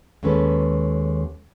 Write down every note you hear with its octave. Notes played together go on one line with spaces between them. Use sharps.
D#2 G#3 C#4 A4 B4